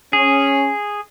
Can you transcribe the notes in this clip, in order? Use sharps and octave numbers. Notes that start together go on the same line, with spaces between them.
C#4 G#4